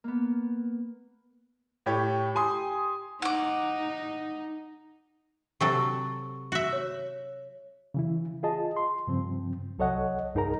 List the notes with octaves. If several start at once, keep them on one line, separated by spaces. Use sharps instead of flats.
A#3 B3
A2 G4 C#5
G4 G#5 C6 D#6
D#4 F#5 D6
C3 F#3 A4 C#6
F#4 E5
C#5
C#3 E3 E4
F4 G#4 D#5 A5
C6
G2 C#3 F3 C4
C2 F#3 A4 C#5 D#5 F#5
C2 G2 D#4 G#4 A#4 A#5